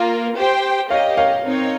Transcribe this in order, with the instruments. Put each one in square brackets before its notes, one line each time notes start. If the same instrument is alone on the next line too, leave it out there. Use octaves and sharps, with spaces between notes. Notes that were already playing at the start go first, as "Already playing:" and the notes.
Already playing: [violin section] A#3 F4 A#4
G4 C5 G5
[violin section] G4 A#4 D#5 [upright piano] C#5 F5
[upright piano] C#5 F5
[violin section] C4 D#4 A#4 C#5